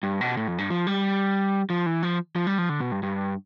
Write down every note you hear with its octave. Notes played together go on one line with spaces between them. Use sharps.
G2
B2
A2
F2
G2
F3
G3
F3
E3
F3
F3
G3
F3
D3
B2
G2
G2